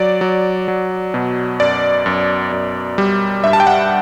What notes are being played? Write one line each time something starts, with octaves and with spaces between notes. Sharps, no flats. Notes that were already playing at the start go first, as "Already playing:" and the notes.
Already playing: F#3 D5
F#3
F#3
B2
F#2 D5
F#2
F#2
G3
G2 E5
A5
G5
F#5